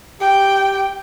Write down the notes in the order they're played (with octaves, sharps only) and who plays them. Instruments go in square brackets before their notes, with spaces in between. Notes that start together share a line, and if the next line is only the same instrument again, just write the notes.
[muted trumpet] G4 [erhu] G5